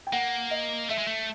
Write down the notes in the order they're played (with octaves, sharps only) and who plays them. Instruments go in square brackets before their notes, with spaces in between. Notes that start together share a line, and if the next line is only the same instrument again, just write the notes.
[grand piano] G5
[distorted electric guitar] A#3 [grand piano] F#5
[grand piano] D#5
[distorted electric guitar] A3 [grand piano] E5
[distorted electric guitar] G#3
A3